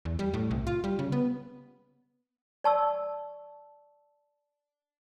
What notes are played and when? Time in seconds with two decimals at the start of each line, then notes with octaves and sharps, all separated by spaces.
0.05 E2
0.19 G3
0.34 A2
0.51 C2
0.67 F4
0.84 G3
0.99 C#3
1.12 B3
2.64 D5 A5 C#6 E6